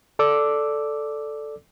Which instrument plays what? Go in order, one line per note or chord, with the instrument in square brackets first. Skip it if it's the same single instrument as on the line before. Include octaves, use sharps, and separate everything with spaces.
[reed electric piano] A4 D5 D6 E6